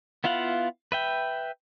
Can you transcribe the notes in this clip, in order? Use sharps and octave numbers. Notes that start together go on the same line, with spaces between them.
B3 E4 F4 F5 F#5
B4 E5 G5